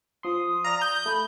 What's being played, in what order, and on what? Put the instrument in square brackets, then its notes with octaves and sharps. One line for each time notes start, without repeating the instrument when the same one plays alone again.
[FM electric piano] F3 C6 [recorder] D#6
[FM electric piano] D5 F5 [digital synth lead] A#5
[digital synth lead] G6
[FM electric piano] A3 [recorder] B5